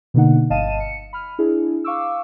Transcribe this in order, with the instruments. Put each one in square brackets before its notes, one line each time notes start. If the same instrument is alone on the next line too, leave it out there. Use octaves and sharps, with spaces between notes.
[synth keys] B2 D3 A#3 D#4 F#5
G1 D#5 F5 A5 D#7 E7
C#7
B5 F6
D4 E4 G#4
F5 C#6 D6 E6